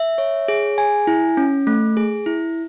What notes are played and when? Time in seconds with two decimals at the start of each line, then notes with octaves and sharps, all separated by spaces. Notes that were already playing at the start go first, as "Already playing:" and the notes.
Already playing: E5
0.18 C#5
0.48 G#4
0.78 G#5
1.07 E4
1.37 C#4
1.67 A3
1.97 G#4
2.26 E4